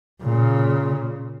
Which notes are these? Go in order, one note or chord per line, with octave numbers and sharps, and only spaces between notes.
A#2 C#3